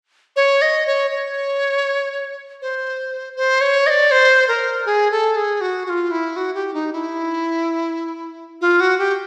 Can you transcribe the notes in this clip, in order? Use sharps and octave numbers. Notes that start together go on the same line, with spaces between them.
C#5
D#5
C#5
C#5
C5
C5
C#5
D#5
D5
C5
A#4
G#4
A4
G#4
F#4
F#4
F4
E4
F#4
G4
D#4
E4
F4
F#4
G4